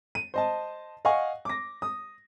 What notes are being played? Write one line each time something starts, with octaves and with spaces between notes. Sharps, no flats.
D#7
C5 D#5 A5
D#5 F5 F#5 G#5 C#6
D6 A#6
D#6